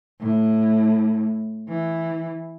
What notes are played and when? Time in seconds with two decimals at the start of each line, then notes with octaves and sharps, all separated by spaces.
0.20 A2
1.69 E3